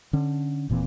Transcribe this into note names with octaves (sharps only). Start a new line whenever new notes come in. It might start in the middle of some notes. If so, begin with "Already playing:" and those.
D3 C#4
D#1 A#2 E3 C4